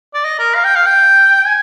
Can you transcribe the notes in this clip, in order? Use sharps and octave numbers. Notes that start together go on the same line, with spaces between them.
D5
D#5
A#4
F5
G5
F5
G5
G#5